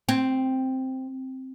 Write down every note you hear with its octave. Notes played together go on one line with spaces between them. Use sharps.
C4